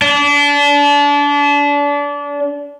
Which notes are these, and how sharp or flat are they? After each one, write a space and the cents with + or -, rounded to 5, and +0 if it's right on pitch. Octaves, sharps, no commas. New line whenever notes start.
D4 -30